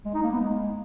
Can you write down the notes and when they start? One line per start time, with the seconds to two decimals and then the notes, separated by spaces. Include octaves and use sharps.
0.05 G#3
0.14 D#4
0.23 A#3
0.32 B3
0.41 G#3